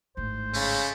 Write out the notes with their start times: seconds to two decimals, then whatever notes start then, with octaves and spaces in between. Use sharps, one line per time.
0.17 G#1 A2 C5
0.53 C#3 G#3 A3